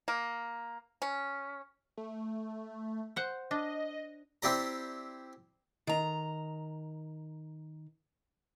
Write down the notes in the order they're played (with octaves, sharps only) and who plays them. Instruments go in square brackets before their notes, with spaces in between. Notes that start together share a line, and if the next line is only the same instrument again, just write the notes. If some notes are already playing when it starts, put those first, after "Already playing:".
[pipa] A#3
C#4
[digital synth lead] A3
[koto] C5 F#5
[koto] D4 [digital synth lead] D#5
[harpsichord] C4 E4 G4 D5 A#5
[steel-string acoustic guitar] D#3 A#5